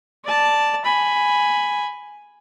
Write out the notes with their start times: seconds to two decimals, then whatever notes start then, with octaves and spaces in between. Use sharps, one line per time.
0.25 D5 A5
0.85 G#5 B5